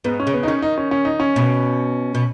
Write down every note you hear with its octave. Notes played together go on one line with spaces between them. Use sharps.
G#2 B3
C#4
C#3
B3
D#4
D#3 C#4
D#4
C#4
C#4
D#4
C#4
B2
B2